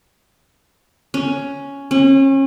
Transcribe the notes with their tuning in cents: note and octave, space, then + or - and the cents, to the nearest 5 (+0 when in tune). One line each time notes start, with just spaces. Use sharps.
C#4 +5
C#4 -35